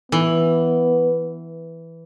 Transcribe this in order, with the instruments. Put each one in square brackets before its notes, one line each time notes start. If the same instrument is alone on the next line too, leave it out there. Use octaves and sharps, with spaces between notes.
[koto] E3 [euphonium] B3